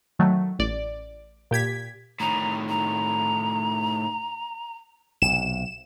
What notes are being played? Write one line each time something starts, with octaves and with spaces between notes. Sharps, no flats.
D#3 F#3 A3
A1 D5
A#2 G4 G#6 B6
A2 D#3 A#5
A#5
B1 C3 E7